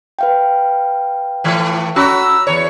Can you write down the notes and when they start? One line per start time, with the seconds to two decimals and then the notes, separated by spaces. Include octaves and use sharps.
0.19 B4 F5 G5
1.44 A2 E3 A3
1.96 C#4 F#4 A#5 B5 E6
2.47 E2 C#5